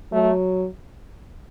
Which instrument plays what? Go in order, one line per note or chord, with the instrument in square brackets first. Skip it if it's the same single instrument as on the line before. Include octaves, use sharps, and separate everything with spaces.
[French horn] F#3 [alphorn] A3